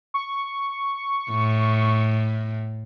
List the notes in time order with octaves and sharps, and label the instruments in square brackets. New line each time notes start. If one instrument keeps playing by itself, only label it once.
[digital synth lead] C#6
[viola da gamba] A2